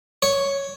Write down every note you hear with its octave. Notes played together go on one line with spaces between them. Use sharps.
C#5